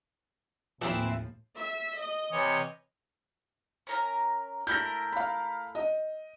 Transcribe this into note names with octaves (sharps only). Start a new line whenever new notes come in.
D#2 A2 E3 F3 C4 E4
E5
D#5
C3 E3 C#5
C#4 A#4 A#5
A3 E4 A#4 G6 A#6
F5 B5
D#5